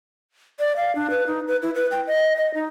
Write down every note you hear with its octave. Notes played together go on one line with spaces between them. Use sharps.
D5
F5
D4
B4
D#4
B4
E4
B4
G5
D#5
D#5
D#4